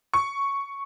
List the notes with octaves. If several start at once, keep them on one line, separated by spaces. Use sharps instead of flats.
C#6